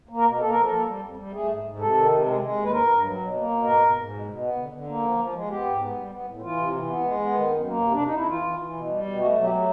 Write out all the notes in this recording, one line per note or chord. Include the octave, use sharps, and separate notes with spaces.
A#3
A#4
B2
A#3 A4
F3 A#4
A4
A#3
G3
F2
G3
A3 G#4
G#2
G#2
C3 A4
D#3
C3
G#3
G#3
D#2
B4
G2 A#4
G2
F#3
B2
A#3
B2
G#2 A#4
G#2
G#2
B2
B2
B3
D3
D3
A#3
F3
F3
G#3
B3 G4
G#2
B3
G3
B3
A2
E3 F4
C3
E3
B3
G#3
B3
D#3
F#2
A#3
C3
F2 D4
D#4
F2 E4
E3 F4
E3
E3
B2
G3
B2
A3 F#4
F#3
G4
A3